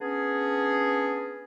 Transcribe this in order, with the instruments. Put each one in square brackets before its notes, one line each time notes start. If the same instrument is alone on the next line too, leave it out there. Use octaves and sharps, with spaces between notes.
[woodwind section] B3 C#4 D4 G#4